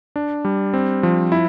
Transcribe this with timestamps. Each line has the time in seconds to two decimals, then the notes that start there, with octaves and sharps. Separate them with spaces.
0.16 D4
0.45 G3
0.74 C4
1.03 F3
1.32 E4